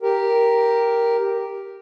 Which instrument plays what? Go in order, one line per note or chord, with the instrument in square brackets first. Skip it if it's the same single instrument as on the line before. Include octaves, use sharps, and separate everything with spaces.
[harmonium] G4 A#4